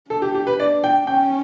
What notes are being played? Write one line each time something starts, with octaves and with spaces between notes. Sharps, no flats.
D4 A4
G4
G4
B4
D4 D5
G5
C#4 G5